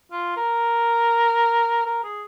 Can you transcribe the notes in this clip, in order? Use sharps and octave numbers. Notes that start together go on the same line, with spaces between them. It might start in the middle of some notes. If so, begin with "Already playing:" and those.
F4
A#4
A#4
G#4